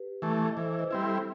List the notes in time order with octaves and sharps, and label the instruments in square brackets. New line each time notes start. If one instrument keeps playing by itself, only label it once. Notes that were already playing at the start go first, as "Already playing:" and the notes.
Already playing: [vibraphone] G4 B4
[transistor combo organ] E3 A3
[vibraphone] D#5
[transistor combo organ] E3 [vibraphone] A4 C5
[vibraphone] C5
B4 D#5
[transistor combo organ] G3 C4 E4
[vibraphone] A4 C5